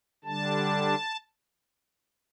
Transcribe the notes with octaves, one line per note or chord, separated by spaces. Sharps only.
D3 G3 D4 A5